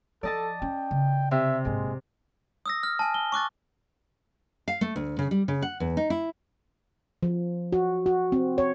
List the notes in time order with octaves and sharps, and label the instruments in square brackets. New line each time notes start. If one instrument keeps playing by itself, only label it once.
[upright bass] F3 [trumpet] A4 [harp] D5 D#5 A5
[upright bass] C#4 [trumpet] G5
[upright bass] C#3
[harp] C3 [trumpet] E5
[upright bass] A#1 G#2 [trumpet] G#3
[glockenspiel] D#6 E6 A#6
F6
G#5 A5
G7
C#6 D6 F#6 A6
[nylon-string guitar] F5
A3
D2
C#3
G3
C#3
F#5
E2
D#4
E4
[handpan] F3
F#4
F#4
C4
C#5